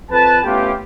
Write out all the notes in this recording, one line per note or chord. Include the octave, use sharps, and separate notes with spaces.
F2 B4 A5
A3 B3 C#4 E4 F4 G4